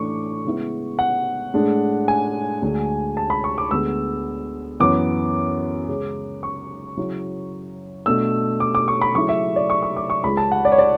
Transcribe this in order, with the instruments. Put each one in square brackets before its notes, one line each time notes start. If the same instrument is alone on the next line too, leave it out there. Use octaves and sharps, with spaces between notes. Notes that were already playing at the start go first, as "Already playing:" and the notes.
Already playing: [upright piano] A2 E3 A3 D4 C#6 D6
C#3 G#3 B3 E4
F#5
A2 G#3 D4
G#5
D2 D3 G#3 D4
A5
B5
C#6
D6
D2 D3 G#3 B3 E6
F#2 E3 B3 D6
C#3 G#3 C#4
C#6
C#3 F#3 C#4 E4
B2 A3 D4 E6
D6
D6
C#6
B5
C#3 F#3 A3 E4 C#6
E5
D5
C#6
C#6
D6
C#6
C#2 C#3 G#3 B5
A5
F#5
D5
C#5
D5